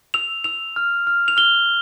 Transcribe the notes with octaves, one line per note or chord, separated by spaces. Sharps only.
E6 F7
E6 F7
F6
F6
F7
F6 G7